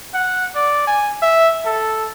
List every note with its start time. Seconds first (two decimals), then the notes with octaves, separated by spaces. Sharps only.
0.14 F#5
0.56 D5
0.87 G#5
1.22 E5
1.65 A4